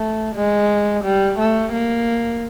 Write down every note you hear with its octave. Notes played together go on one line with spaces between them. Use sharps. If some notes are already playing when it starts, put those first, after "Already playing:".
Already playing: A3
G#3
G3
A3
A#3